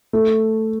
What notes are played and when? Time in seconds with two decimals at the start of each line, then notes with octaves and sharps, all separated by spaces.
0.13 A3